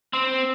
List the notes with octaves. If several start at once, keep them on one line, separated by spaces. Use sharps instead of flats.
C4